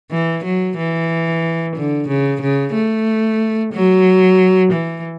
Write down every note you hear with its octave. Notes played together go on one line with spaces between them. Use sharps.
E3
F#3
E3
D3
C#3
C#3
A3
F#3
E3